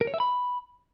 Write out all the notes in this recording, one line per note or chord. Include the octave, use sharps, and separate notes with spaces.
A#4
C#5
E5
B5